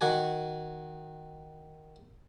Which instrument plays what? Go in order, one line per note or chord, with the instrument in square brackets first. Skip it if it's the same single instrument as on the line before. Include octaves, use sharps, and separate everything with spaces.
[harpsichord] D#3 F#4 G#5